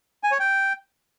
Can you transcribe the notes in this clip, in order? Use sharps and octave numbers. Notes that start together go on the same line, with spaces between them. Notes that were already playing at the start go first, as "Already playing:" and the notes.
G#5
C#5
G5